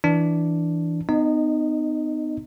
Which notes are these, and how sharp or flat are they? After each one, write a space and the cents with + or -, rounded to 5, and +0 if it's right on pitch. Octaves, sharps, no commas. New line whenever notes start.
E3 +0 D4 +0
B3 +30 D#4 -25 D#5 +0